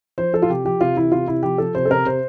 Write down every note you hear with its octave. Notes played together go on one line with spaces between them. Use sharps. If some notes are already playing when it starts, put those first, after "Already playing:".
F3 C5
F3 A4
F4
C3 G4
F3 G4
C3 F4
E3 E4
C3 F4
C3 E4
F3 G4
F3 A4
C3 C5
A4
C3 A#4
C3 C5